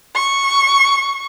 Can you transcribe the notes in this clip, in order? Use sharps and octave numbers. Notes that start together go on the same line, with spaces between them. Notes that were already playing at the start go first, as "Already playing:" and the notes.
C#6